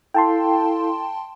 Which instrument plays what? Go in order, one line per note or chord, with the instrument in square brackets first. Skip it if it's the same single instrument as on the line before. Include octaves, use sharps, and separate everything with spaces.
[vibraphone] E4 A4 F5 [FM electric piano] G5 A5 C6